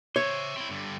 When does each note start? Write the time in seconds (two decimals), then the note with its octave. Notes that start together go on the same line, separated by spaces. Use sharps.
0.16 C5 C#5 E5
0.56 C4 E4
0.70 G2 D3